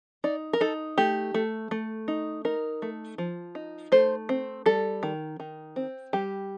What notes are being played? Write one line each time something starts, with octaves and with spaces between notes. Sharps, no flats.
D#4 D5
A#4
D#4 A4
A3 G4
A3
A3
D#4
D#4 A#4
A3
F3
D#4
A3 C5
C4
G3 A4
D#3
D#3
C4
G3 G4